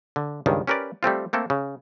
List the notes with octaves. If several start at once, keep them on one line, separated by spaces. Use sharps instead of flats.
D3
C#2 G2 D#3 F#3
C#4 G4 A#4 B4 D5
G3 A3 C4 F4
A3 A#3 C4 A4
C#3